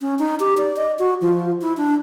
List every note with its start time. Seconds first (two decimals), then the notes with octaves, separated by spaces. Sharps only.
0.01 C#4
0.19 D#4
0.40 G4
0.58 D5
0.76 D#5
0.99 F#4
1.21 F3
1.61 E4
1.77 D4